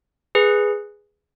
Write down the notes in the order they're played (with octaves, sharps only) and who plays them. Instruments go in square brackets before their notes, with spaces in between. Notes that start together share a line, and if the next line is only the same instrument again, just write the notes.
[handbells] G#4 B4